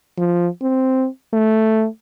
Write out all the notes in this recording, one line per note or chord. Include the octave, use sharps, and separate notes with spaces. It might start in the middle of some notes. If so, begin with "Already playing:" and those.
F3
C4
A3